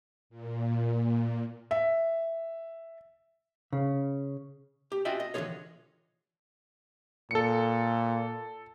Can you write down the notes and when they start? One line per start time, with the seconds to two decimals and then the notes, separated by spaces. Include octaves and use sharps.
0.30 A#2
1.71 E5
3.73 C#3
4.92 G4
5.05 C#4 F4 F#4 D#5 E5 G5
5.20 D#5
5.34 D3 E3 G3 F4 G#4 C#5
7.31 A#2 A4 C#7